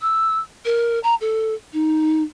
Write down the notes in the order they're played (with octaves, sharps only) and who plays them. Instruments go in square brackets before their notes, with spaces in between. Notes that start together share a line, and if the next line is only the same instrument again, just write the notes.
[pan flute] E6
A#4
A#5
A4
D#4